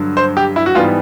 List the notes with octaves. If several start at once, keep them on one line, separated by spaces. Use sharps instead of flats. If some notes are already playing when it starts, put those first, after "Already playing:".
Already playing: G2 D3 F#3
C5
G4
E4
F#4
G#2 E3 G3 B3 F4